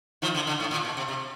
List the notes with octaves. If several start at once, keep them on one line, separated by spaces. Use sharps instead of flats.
D#3 F3
D3 E3
D3
A2
A#2
B2
C3
C3